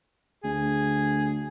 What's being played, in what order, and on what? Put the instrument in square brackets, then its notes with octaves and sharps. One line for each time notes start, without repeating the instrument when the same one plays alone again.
[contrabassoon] D2 [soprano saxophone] G#4